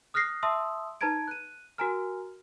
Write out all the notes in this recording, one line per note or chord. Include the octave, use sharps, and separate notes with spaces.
D#6 F6 F#6 A#6 C7
E5 A5 C6 D#6 E6
D#4 B4 A5 A#5 G#6 D7
F#6 D#7
F#4 A#4 G#5 A#5 F6